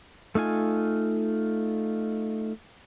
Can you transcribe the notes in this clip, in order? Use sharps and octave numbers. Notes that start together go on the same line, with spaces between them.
A3 D#4 F4 G#5